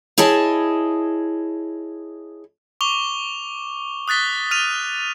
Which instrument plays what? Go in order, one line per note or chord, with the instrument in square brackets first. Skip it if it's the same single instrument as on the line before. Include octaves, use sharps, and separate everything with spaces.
[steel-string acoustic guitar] E4 G#4 C#5 D#5 A5
[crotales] C#6 D6 F7 G7
D#6 F#6 A6 B6 G7
F6 D#7 F7